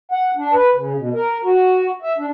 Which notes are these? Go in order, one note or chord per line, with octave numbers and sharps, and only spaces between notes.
F#5
D4
B4
C#3
B2
A#4
F#4
E5
D4